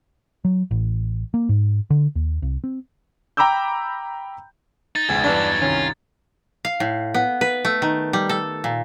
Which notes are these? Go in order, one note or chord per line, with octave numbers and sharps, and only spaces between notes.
F#3
A1
A#3
G#2
D3
D#2
C2
C4
G5 A#5 B5 D6 E6 G6
D#4 A6
E1 C#2 G#2 G#4 G#6
E2 G2 F#3 D4 D#4 B4 A6
C2 F#2 D#3 C#4 F4
F5
A2
B3
B4
A3
D#3
G3
A4
A#2